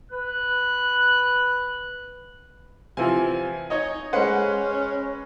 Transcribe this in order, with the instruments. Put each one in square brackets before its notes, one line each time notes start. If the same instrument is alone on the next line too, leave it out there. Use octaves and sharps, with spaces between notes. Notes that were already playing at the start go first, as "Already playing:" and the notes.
[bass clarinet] B4 [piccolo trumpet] F#6
[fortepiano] C3 E3 F3 [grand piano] G#5
[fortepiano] D#4 C#5 D#5
[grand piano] G#3 B4 [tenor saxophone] C#4 [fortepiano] C5 F#5